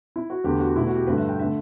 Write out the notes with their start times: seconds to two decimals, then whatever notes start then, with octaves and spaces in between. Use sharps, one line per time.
0.16 E4
0.30 F#4
0.44 E2 D3 A3 G4
0.60 F#4
0.75 B2 A3 E4
0.87 F#4
0.96 G4
1.07 G2 D3 A3 B4
1.18 E5
1.29 G5
1.39 D3 A3 E5